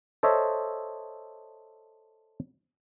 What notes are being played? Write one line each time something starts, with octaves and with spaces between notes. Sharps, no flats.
A4 C5 C#5 D#5 E5